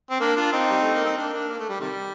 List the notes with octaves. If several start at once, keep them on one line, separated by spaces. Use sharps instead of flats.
C4
A#3 D4
D4 F4
C4 D#4
G3
A3
A#3
C4
A#3 D4
A#3 D4
A#3
A3
G3
C3 D#3 G3